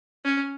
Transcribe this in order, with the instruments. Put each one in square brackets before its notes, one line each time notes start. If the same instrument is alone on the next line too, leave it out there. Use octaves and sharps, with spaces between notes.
[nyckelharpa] C#4